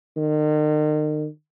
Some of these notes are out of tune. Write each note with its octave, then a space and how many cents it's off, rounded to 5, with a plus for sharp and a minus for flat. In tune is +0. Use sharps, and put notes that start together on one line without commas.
D#3 -40